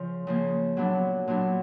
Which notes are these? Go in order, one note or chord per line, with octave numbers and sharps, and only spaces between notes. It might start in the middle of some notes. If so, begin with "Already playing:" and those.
Already playing: C#3 F3
C#3 F3 A#3
A#2 F#3 B3 D4
A#2 F#3 B3 D4